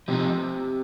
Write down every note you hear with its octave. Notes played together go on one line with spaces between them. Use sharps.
C3 F3 C4 D#4